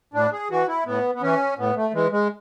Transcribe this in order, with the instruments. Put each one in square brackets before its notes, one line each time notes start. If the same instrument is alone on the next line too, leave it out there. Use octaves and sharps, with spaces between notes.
[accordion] A2 D4
G#4
E3 F#4
E4
A2 B3
B3
E3 C#4
A2 B3
A3
E3 G#3
G#3